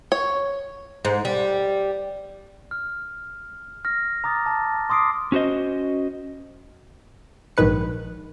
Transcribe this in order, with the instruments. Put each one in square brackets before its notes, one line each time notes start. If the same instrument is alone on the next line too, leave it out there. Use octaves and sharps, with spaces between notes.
[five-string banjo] C#5
[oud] G#2
G3
[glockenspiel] F6
F6 A#6
A#5 D6 D#6 A6
A5
C6 D6 D#6 C7 D7
[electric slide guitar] C#4 F#4 C5 D#5
[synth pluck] A#1 G#2 D#3 B4 C#7